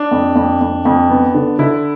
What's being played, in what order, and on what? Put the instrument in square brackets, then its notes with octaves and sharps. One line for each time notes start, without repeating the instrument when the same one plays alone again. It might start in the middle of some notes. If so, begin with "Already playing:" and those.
Already playing: [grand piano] D4
[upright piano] F2
F2
F2
F2
B3
D3
[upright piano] D3 [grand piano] E4